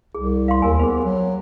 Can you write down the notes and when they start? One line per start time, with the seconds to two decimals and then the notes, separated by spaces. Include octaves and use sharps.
0.15 C2 G#4
0.48 F5 C6
0.62 D#2 A#4 G#5
0.79 B3 G#4 C5
1.04 F#3